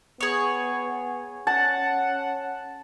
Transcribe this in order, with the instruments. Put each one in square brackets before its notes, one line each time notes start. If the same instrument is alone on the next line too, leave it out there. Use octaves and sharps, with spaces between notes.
[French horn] B3 [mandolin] G#4 C#5
[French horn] C#4 [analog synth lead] F#5 [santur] A5